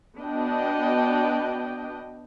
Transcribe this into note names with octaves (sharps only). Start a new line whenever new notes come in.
B3 D4 F#4 D#5 G5